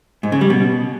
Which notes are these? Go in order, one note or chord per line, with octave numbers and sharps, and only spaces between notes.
G#2
C#3
G3
B2